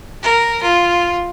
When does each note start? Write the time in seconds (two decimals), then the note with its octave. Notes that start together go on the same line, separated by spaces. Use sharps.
0.23 A#4
0.63 F4